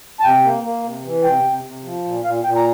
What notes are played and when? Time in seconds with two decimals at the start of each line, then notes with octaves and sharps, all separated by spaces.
0.20 A5
0.24 C3 G5
0.44 A#3
0.64 A#3
0.83 C3
1.04 E3
1.23 C3 G5
1.43 C3
1.63 C3
1.84 F3
2.04 A#2
2.24 A#2 F5
2.44 A#2 G5
2.56 A#5